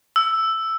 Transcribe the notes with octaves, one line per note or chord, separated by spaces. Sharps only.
E6